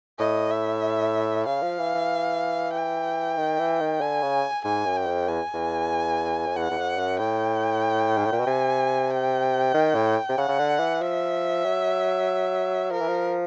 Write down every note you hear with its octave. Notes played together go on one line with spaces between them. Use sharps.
A2 D#5
E5
C#3 F5
F3
E3
E3
G5
D#3
E3
D#3
D3 G#5
C#3
G#2 G#5
F#2
G5
F2
E2 G#5
E2
F2
E2 F#5
E2
F2
F#2
A2 G5
G#2
A2
A#2
B2
C3 G#5
G5
D#3
A2
C3
C#3 F#5
C#3
D3
E3
F3 E5
F#3
F3 A#4
E3
F3